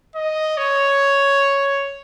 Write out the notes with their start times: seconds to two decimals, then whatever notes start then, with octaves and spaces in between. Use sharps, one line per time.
0.15 D#5
0.57 C#5